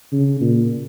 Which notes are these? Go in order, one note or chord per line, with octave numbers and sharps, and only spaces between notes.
C#3
A#2